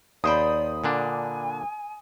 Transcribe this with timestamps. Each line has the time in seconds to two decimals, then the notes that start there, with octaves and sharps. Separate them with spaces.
0.24 D#2 C5 D5 G5 B5 D#6
0.84 A#2 D3 D4 G#5